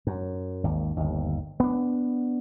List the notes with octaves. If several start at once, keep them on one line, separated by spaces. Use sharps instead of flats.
F#2
G#1 D#2
G1 D#2
B3 D4